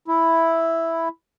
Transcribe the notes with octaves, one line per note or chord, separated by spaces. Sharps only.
E4